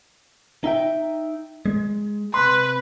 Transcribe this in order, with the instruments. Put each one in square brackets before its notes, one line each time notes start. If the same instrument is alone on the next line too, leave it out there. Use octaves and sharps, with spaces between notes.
[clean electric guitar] D#4 E5 G5
G#3
[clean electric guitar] C3 C6 [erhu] B4